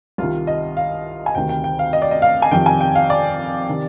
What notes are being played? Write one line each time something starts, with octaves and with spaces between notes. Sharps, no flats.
C2 C3 D#3 F4
D#5
F5
G#5
D2 C3 D#3 G5
G5
G5
F5
D#5
D5
D#5
F5
G#5
F2 C3 D#3 G5
G#5
G5
F5
D5
C3 D#3